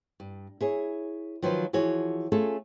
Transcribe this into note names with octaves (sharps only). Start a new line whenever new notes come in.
G2
E4 G#4 C#5
D#3 F3 F#3 F4 B4 C5
E3 F3 F#4 G#4 C#5
A3 C#4 F4 G#4 A4